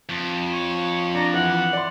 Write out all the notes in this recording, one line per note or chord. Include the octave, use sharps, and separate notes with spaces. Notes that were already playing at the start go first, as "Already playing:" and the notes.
F2
C#5
D4 A#5
E3 F#5
D5 C6